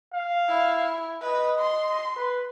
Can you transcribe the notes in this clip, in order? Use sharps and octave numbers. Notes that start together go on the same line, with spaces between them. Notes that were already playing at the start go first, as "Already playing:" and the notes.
F5
E4
B4 D#5
C6
B4